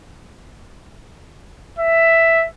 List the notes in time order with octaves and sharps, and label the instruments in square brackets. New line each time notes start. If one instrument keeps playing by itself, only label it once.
[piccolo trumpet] E5